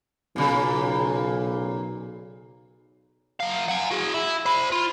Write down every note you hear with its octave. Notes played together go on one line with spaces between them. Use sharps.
B1 A#2 C#3
F#3 F5
F#5 G#5
F#4 G#4
E4
C5 B5
F4